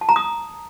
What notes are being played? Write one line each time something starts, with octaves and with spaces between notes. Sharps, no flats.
A5
A#5
D#6